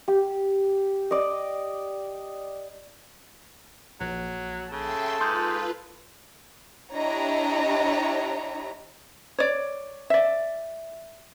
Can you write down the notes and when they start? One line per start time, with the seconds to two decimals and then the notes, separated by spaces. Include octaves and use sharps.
0.08 G4
1.11 D5 D#5
4.01 A#1 F#3
4.72 C#3 A4 E5 G5 C6
5.21 G#2 F4 B4 C6 D#6 G6
6.94 D4 E4 G4 C#5 D#5 A#5
9.38 C#5 D5
10.10 D5 E5